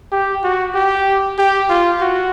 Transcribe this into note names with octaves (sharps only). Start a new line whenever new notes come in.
G4
F#4
G4
G4
F4
F#4